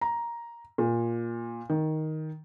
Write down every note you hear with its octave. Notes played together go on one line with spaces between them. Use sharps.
A#5
A#2
D#3